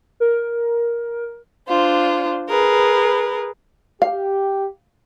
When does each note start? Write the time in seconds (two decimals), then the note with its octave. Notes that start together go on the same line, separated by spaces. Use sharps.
0.20 A#4
1.68 D4 F4 C5
2.50 G#4 A#4 B4
4.02 G4 F5